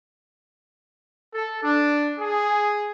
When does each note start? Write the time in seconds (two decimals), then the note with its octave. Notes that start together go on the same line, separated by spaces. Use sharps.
1.34 A4
1.63 D4
2.19 G#4